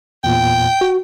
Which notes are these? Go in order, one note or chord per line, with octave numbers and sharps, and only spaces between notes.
E2 A#2 G5
F#4